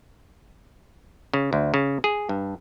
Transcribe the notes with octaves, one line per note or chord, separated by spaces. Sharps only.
C#3
D2
C#3
G#4
G2